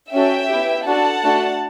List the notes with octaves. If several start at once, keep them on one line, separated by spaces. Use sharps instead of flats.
C#4 F#4 A4 E5 G5
B3 E4 G4
D4 F#4 A4 F#5 A5
A3 D4 F#4 A4